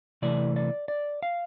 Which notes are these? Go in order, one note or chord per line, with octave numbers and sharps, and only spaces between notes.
C3 E3 A3 D5
D5
D5
F5